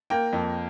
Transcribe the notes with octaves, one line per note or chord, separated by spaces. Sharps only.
A#3 G5
F2